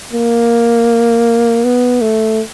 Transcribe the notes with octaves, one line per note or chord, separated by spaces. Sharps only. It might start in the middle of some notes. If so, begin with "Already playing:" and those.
A#3
B3
A3